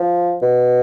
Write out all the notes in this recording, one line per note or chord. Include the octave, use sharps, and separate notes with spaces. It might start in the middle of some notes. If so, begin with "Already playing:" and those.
Already playing: F3
B2